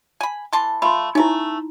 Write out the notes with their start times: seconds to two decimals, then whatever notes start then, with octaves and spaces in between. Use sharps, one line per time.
0.21 G#5 B5
0.53 E3 A5 C6
0.82 A3 F4 B5 C6
1.15 A3 C#4 D#4 E4